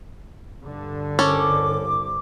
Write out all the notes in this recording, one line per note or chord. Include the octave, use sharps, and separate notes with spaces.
G2 D3
C2 C#4 A4 D6